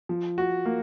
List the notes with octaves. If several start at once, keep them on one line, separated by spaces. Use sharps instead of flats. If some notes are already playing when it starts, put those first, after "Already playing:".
F3
F#4
A#3